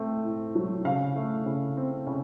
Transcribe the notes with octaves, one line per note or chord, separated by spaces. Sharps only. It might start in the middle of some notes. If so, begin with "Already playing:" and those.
Already playing: A3 C4
A2
F#3
C#3 F5
A3
C#3
C4
C#3